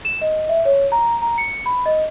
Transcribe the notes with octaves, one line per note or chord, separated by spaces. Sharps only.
E7
D#5
E5
C#5
A#5
A#5
C#7
B5
D#5